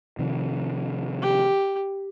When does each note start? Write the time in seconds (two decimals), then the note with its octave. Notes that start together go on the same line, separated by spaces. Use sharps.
0.19 C3 D#3 F3
1.22 G4